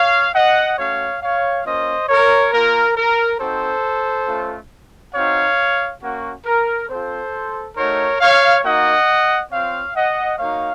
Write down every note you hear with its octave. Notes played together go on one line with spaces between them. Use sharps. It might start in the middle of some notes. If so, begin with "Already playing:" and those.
Already playing: C#5 F5
D#5 F#5
A3 C#4 F#4 C#5 F5
C#5 F5
A#3 C#4 F4 C5 D#5
A#4 C#5
A#3 F4 A#4
A#4
C4 D#4 F#4 A4 C5
A3 C#4 F4
C4 D#4 F#4 C#5 F5
A#3 C#4 F#4
A#4
C4 F4 A4 C5
A3 D#4 F#4 A#4 C#5
C#5 F5
A#3 D#4 F#4 D#5 F#5
C4 F4 C#5 F5
D#5 F#5
A#3 D#4 F#4 C#5 F5